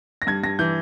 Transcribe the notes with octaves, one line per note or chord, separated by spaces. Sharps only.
A#6
G2 G#6
G2 A#6
E3 G6